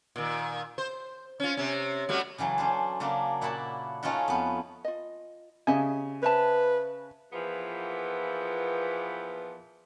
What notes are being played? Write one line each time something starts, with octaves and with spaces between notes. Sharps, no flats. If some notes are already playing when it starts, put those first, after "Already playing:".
A#2 D#3
C5
C#4 F4
C3 C#4
G3 A3 F#4
C#3 E3 F#3 A3
C#4 D4 C5
C#3 F#3 A#3 D4
A#2 E4 F#4 E5 A5 B5
A3 C#4 D#4 F4 F#4
F2 B3
F4 D#5
C#3 G4 D#5 E5 G#5
B4 C5 E5 A5
E2 A#2 E3 F3 B3